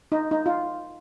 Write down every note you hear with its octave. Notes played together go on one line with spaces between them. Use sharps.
D#4
D#4
F4